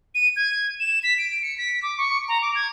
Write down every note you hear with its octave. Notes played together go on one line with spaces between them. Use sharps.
D#7
G#6
E7
B6
D7
C#7
B6
D6
C#6
A#5
D6
G#6